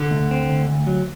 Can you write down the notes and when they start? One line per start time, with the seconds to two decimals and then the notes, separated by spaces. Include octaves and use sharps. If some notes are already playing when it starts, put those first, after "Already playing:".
Already playing: D3
0.11 D2
0.31 C4
0.50 D2
0.69 D2
0.87 F#3